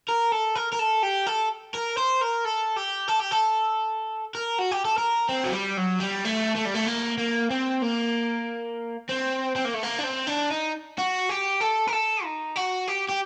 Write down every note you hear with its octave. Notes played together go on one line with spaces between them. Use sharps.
A#4
A4
A#4
A#4
A4
G4
A4
A#4
C5
A#4
A4
G4
A4
G4
A4
A#4
F#4
G4
A4
A#4
C4
F#3
G3
F#3
G3
A3
A3
G3
A3
A#3
A#3
C4
A#3
C4
C4
A#3
A3
A#3
D4
C4
D4
D#4
F#4
G4
A4
A#4
A4
D#4
F#4
G4
G4